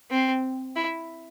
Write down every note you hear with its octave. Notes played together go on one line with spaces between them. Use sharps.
C4
E4